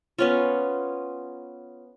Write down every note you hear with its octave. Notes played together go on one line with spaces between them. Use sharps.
B3 C#4 F4